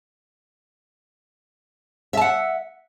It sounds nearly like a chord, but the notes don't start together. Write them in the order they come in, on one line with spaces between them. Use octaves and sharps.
E5 A5 F#5